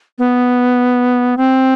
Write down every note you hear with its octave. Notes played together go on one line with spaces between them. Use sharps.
B3
C4